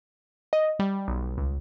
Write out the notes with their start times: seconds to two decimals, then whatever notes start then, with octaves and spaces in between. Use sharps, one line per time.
0.53 D#5
0.79 G3
1.08 B1
1.38 C#2